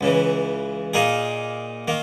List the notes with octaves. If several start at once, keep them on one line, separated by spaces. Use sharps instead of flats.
C#2 C#3 E3
A#2 A#3 D#4 G#4
D#3 A#3